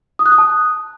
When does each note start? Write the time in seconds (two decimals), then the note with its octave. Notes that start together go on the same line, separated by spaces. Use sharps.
0.19 D#6
0.26 F#6
0.32 D#6
0.38 A5